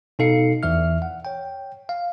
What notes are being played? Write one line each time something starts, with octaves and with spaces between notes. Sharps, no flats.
B2 D#4 A4 F5 C7 C#7
E2 E3 E5 F6
F#5
C#5 G5
F5